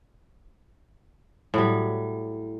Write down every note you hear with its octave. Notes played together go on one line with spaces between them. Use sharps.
A2 F#3 G3